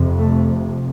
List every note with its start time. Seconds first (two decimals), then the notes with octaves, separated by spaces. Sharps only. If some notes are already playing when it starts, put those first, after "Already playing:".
Already playing: F2 C3
0.18 A3